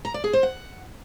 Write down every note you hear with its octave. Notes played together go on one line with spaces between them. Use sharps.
A#5
D5
G#4
C5
F#5